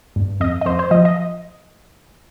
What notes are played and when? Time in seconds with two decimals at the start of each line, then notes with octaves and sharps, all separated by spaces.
0.16 G2
0.40 F2 D#5
0.61 D#5
0.66 F2 C5
0.79 C5
0.91 F3 D#5
1.05 D#5